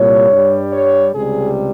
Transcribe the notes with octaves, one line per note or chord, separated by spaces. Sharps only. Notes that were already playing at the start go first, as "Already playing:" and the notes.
Already playing: C2 A#2 G3 C#5
G2 G3
C#5
C#2 C3 G3 G#4